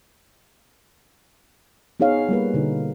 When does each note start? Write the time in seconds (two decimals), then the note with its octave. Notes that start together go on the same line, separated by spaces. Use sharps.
2.00 B3 D#4 G#4 C#5 F5
2.29 G3 A#3 B4
2.54 B2 D3 D#4